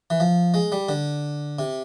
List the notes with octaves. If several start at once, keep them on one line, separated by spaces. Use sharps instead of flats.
E3
F3
G#3
G3
D3
C3